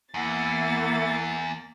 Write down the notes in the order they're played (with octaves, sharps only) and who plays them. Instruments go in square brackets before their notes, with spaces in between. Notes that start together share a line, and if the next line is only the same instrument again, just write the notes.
[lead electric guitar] E2 [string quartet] A#3 A6 [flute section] E4 F#5